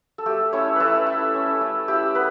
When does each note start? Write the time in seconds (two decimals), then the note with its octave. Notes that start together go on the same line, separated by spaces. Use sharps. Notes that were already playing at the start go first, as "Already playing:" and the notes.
0.18 A4
0.26 A3 G4
0.53 C#4 E4 C#5
0.76 A3 E4 A4 B4
1.07 E4
1.35 C#4
1.61 A3
1.88 E4 G4
2.15 B3 B4